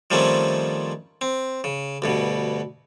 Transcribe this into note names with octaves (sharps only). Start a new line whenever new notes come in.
D#3 F3 G3 A3 C4 C#4
C4
C#3
D2 G2 B2